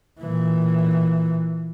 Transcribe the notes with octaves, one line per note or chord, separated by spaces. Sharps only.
A#2 E3